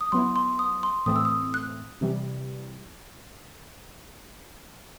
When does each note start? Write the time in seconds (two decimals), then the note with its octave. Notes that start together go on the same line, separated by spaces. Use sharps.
0.01 D#6
0.12 F#3 B3 E4 C6
0.36 C6
0.59 D#6
0.83 C6
1.06 A2 E3 A3 C4 D#6
1.16 E6
1.25 D#6
1.54 F#6
2.01 C3 E3 G3